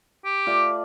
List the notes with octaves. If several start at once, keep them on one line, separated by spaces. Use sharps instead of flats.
G4
A3 F4 D5 D6